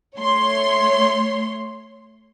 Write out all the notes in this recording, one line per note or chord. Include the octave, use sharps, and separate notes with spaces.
A3 C#5 C6